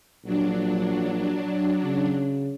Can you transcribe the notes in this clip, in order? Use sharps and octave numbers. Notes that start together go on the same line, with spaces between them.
A#1 F#3 D4
C#3